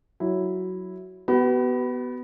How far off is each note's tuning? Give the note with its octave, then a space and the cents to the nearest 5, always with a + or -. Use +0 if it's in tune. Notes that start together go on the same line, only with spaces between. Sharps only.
F#3 +0 E4 +0
B3 +5 F#4 +45 B5 +0